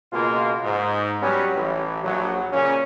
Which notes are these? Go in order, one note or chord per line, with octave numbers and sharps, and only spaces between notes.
C#2 B2 G#3 A#3 F4
G#2
F#3 G3 B3 C#4
A1
A#1 F#3
A#2 C#3 C#4